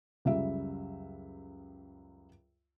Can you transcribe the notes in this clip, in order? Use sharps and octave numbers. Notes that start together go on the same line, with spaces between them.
C#2 F#2 G3 E5